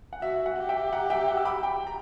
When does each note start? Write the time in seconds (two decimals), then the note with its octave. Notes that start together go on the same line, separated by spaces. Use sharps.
0.13 F#5
0.22 F#4 E5
0.46 F#5
0.57 G4
0.69 E5 G5
0.93 F#5 A#5
1.10 E5 G5
1.28 F#5
1.38 E6
1.45 B5 D6
1.63 G5 B5
1.87 A#5